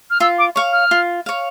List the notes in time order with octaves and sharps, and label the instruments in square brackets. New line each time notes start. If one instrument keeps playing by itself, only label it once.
[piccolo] F6
[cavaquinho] F4 [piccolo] E6
[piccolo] D6
[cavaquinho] C#5 F5 [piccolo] C#6
[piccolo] F6
[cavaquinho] F4
C#5 F5